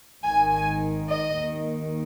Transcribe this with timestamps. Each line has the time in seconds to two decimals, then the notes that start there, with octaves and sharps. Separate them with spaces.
0.23 G#1 G#2 D#3 G#5
0.51 G#5
1.08 D#5
1.35 D#2 D#3